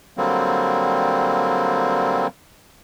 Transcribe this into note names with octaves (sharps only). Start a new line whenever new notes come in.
D3 F#3 G3 A#3 C4